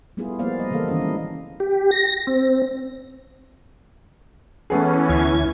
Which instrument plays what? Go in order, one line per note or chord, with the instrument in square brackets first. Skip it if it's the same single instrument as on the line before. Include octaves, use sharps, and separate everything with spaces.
[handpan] G3 A3 B3 E4 F4 G#4
F3 A#3 B3 C5 D5 F5
G3 D#5
C#3 E3 A#3 A4 F5
D#3 E3 C#4 E4 D#5
G3 G#3 C#4
[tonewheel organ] G4
A#6
C4
[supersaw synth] E3 C#4 [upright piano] A3 B3 G#4
[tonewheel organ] D2 E4 G#6